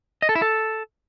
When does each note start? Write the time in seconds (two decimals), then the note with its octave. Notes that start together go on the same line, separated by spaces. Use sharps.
0.22 D#5
0.29 A4
0.35 E4
0.42 A4